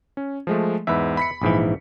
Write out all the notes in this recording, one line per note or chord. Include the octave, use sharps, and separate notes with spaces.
C#4
F3 G#3 A3
E2 G#2 B4 E5
B5 B6 C#7
A#1 G#2 E3